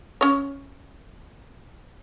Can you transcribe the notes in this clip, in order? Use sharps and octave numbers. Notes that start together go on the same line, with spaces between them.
C#4 C#5